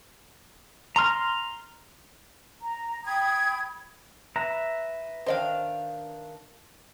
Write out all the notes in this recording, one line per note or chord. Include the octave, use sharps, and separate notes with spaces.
A#5 C6 F6
A#5
G5 B5 D#6 G#6
B4 E5 A#5
D#3 D4 C5 D#5 F5 G5